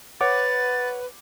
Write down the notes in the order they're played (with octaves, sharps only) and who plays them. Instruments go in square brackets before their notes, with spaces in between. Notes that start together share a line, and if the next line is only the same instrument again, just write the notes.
[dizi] B4 [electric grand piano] C#5 F#5 D6 [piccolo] A6